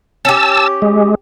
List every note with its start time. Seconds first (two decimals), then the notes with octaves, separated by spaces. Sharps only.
0.25 C#4 G4 A5 E6
0.82 G#3